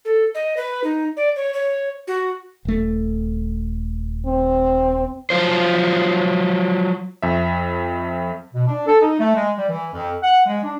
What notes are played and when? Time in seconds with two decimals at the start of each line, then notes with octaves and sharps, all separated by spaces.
0.05 A4
0.35 D#5
0.57 B4
0.84 D#4
1.17 D5
1.36 C#5
1.53 C#5
2.07 F#4
2.65 D#1 A3
4.26 C4
5.30 F3 F#3 F4 C5
7.22 F2 E5
8.53 B2
8.68 D4
8.87 A4
9.01 D#4
9.19 A3
9.35 G#3
9.57 G3
9.69 E3
9.94 F2
10.23 F#5
10.46 G#3
10.63 D4